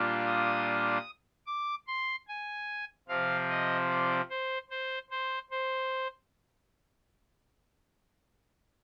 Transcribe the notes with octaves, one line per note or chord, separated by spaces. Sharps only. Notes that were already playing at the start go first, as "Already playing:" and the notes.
Already playing: A#2 G3 D4 F4
D#6
D6
C6
G#5
C3 F3 C4 F5
D#5
D5
C5
C5
C5
C5